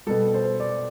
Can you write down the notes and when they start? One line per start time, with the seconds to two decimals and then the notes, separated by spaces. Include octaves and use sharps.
0.07 B2 G3 A4
0.34 C5
0.60 D5